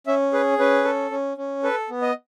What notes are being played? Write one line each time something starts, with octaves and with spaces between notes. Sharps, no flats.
C#4 E5
G#4 B4
C#4 B4
A4
C#4
C#4
A4 B4
B3
D#5